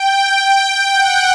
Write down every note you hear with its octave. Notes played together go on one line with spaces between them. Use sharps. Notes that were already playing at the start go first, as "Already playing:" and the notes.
Already playing: G5
F#5